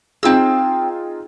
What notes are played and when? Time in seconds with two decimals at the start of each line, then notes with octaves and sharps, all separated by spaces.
0.23 C4 D#4 F4 G#4 E6